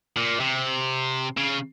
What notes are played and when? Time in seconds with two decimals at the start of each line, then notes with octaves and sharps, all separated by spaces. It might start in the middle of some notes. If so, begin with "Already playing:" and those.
0.17 A#2
0.40 C3
1.37 C#3